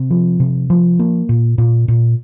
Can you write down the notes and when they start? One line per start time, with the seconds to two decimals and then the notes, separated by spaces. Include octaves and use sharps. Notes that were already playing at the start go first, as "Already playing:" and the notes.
Already playing: C3
0.10 F3
0.40 C3
0.70 F3
0.99 A#3
1.29 A#2
1.58 A#2
1.88 A#2